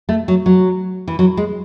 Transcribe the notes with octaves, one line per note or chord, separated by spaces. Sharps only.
A3
F#3
F#3
E3
F#3
G#3